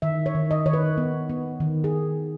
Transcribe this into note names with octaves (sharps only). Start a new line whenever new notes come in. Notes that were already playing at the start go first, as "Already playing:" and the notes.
D#3 E5
C#5
D#3
D#5
D#3 C#5
B4
B3
B3
D#3
G#4